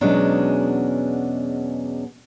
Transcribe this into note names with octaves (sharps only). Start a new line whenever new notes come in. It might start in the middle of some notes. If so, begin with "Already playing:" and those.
E2 B2 F#3 G#3 C#4 D4